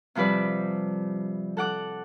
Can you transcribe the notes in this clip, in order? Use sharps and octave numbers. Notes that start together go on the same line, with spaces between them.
C3 F3 G3 B4 D5
A4 F#5 D6 F#6